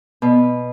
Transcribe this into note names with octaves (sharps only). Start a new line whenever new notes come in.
B2